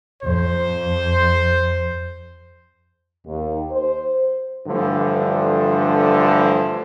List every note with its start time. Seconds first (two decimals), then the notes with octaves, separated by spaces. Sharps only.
0.23 F2 C5
3.27 D#2
3.72 C5
4.67 G2 D3 E3 F3 A3